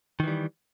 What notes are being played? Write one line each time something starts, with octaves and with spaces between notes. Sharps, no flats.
D#3 E3 G3